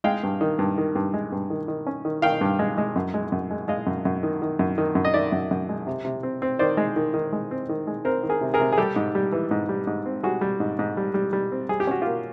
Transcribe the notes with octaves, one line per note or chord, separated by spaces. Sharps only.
G#3 F5 G5
G2
D#3
G2
D#3
G2
G#3
G2
D#3
D#3
C#4
D#3
D#3 F5 G5
G2
G#3
G#3
F#2
G#3
F#2
G#3
G#3 D#5 F5
F#2
F#2
D#3
D#3
F#2
D#3
F#2
D#5
D#3 D5 E5
F#2
F#2
G#3
C3
C3
C4
C4
D#3 C5 D5
G#3
D#3
D#3
G#3
C4
D#3
G#3
C4 A#4 C5
D#3
G#4 A#4
C3
G#4 A#4
C3
G#4
G3 G4 A4
G#2
G3
E3
G#2
G3
G#2
C4
G3 F#4 G#4
G3
G#2
G#2
G3
G3
G3
C4
G3 G#4
G4
C#4 F#4
A#3 F4 G4